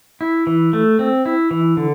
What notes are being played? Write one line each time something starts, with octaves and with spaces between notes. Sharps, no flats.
E4
E3
A3
C4
E4
E3
D3